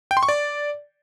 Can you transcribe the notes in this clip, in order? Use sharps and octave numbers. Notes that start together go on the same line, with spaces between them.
G5
C6
C#6
D5